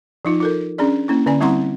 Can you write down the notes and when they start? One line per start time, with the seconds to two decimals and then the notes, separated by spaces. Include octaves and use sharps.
0.25 F3 D#4 F4
0.40 F4 A4 A#4
0.78 C#4 D4 G#4 D5
1.08 A#3 C#4 E4
1.26 D3 C#4 D5 G#5
1.40 G3 C4 E4 F#5 A#5 C6